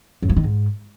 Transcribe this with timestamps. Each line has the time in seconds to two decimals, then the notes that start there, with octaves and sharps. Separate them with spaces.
0.22 F#2
0.29 F3
0.36 D#3
0.44 G#2